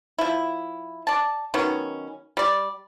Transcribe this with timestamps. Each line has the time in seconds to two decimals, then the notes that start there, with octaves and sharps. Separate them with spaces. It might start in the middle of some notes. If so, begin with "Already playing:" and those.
0.18 F3 E4
1.07 D5 A5
1.54 D#3 F#3 B3 C#4
2.37 G3 D5